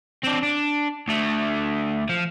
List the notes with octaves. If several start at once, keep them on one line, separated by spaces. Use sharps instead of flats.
C4 D4
D4
D2 A3
F3